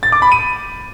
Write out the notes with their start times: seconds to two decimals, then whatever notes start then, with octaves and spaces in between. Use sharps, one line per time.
0.03 A6
0.12 D6
0.22 B5
0.32 D#7